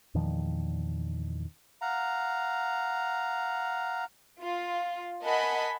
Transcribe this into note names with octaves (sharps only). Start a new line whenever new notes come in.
E2 A#2 D#3 F3
F5 F#5 A#5
F4
A#4 D#5 F#5 G#5 A5 B5